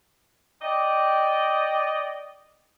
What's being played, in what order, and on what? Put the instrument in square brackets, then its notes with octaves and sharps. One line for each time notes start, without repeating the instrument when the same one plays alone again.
[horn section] D5 D#5 G5